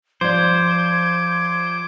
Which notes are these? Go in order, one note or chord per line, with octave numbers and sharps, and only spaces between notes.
F3 C5 D5 D6 G#6